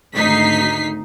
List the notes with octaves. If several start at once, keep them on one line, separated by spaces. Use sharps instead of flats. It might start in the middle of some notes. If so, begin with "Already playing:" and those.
G#1 D2 D#4 B6 C7